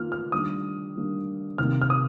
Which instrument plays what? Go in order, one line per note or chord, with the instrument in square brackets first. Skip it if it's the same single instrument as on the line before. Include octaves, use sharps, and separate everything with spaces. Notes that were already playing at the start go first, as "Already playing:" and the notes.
Already playing: [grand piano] D#3 A#3 F4 F6
F6
D#3 G3 A#3 D4 D#6
D#3 G3 A#3 D4
C3 D#3 A#3 F6
F6
D#6